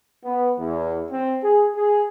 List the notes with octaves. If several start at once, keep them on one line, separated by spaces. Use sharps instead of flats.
B3
E2
C4
G#4
G#4